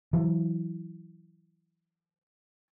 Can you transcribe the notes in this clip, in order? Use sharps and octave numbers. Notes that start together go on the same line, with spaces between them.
E3 F#3